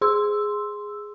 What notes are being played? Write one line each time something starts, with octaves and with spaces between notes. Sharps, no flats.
G#4 C6 E6